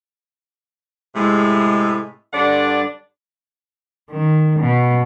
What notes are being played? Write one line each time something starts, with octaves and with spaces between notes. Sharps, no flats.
A2 C3 G#3
G2 D3 D4 D5 F#5
D#3
B2